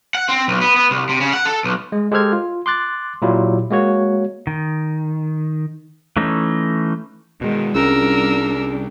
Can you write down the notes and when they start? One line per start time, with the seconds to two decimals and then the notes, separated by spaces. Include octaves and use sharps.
0.15 F#5
0.29 C4
0.48 B1
0.61 B3
0.76 B3
0.91 C2
1.09 C3
1.21 C#3
1.33 F#5
1.45 A4
1.64 B1
1.92 G#3
2.12 G#3 G4 A4 C5 F6 G#6
2.33 F4
2.66 C6 D6 F#6 A6
3.22 A#2 F#3 E4 F4 G4
3.71 G#3 A#3 F#4 C#5
4.47 D#3
6.17 E3 A3 C#4 D#4
7.41 B2 D#3 G#3
7.75 C2 G3 C#4 D4 F4 G#4 A#4 E6